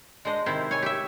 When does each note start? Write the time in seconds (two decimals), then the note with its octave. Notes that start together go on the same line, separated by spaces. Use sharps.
0.25 G#3 D4 C5 D#5
0.46 C3 D#3 E4 C5
0.71 C#5 G#5
0.82 G4 E5